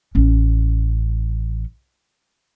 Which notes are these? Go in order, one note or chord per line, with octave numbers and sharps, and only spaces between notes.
A1 C#4